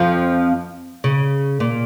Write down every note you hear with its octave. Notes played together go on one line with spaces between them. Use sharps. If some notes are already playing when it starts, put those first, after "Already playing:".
Already playing: F2 F3
C#3
A#2